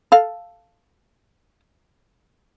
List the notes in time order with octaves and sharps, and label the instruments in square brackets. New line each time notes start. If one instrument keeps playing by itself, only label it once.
[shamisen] A4 F5